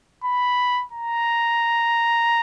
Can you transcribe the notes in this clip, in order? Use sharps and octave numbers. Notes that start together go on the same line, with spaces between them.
B5
A#5